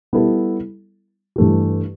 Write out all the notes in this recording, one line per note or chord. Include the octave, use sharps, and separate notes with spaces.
G3 B3 E4 A4
G2 E3 A3 G4